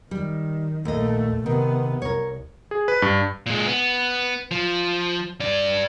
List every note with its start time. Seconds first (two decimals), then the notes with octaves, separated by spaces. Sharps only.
0.11 D#3 G3
0.85 A#1 D#2 A3 D#5
1.46 C3 D#3 B3
2.02 C2 A#4 C#5
2.71 G#4
2.88 B4
3.02 G2
3.46 A#2 G#3
3.67 B3
4.51 F3
5.40 G2 D5